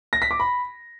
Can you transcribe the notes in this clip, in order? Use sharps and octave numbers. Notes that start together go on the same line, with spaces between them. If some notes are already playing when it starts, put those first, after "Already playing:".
A#6
B6
D6
B5